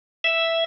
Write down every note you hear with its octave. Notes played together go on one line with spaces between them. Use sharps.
E5